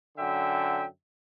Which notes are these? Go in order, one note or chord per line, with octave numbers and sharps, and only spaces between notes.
F#2 D3 E5 G5